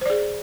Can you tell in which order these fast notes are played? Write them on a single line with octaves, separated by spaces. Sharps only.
C5 D5 G#4